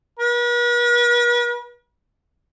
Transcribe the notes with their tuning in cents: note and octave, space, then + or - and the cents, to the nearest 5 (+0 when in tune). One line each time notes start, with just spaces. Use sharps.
B4 -45